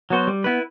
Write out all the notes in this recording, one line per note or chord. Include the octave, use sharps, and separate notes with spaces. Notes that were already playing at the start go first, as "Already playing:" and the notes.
F#3 B3 F#4 C5
G3
B3 E4 B4